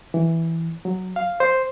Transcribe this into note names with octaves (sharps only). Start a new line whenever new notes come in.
E3
F#3
F5
C5